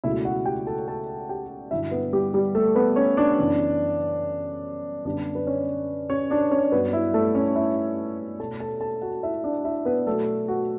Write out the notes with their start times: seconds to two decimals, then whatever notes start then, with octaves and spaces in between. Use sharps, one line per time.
0.04 C#2 B2 F#3 A3 E4 E5
0.25 F#4 F#5
0.46 G4 G5
0.67 A4 A5
0.88 A4 A5
1.29 G4 G5
1.71 G2 D3 F#3 E4 E5
1.91 B3 B4
2.13 G3 G4
2.34 G3 G4
2.55 A3 A4
2.75 B3 B4
2.96 C#4 C#5
3.17 D4 D5
3.38 F#2 C#3 E3 B3
5.05 F#2 D3 G3 B3 D4 D5
5.35 B4
5.47 C#4 C#5
6.10 C#4 C#5
6.30 D4 D5
6.51 C#4 C#5
6.72 G2 F#3 B3 B4
6.93 E4
7.14 A3 A4
7.35 C#4 C#5
7.56 E4 E5
8.39 B2 A3 A4 A5
8.60 A4 A5
8.81 A4 A5
9.02 F#4 F#5
9.23 E4 E5
9.44 D4 D5
9.64 E4 E5
9.85 B3 B4
10.06 B2 F#3 A3 A4
10.48 F#4